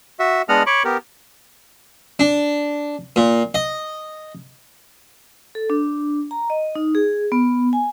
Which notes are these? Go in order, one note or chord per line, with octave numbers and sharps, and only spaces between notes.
F#4 E5
G#3 B3 D4 D#5 F#5 F6
C#5 B5 C#6 D6
B3 G4 A#4
D4
A#2
D#5
A4
D4
A#5
D#5
D#4
G#4
B3
G#5